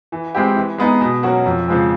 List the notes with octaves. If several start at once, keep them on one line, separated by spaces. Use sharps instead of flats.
E3
G#3 C4 E4 G4
E3
G#3 B3 D#4 G#4
B2
F#3 A#3 C#4 F#4
F2
C#3 F3 G#3 C4